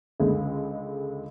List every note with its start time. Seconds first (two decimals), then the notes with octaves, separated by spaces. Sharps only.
0.20 C#2 D3 G#3